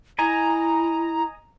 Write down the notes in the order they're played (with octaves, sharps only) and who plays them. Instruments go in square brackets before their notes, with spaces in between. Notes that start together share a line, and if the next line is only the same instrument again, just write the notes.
[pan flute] E4 [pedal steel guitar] D#5 G#5 [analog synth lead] A#5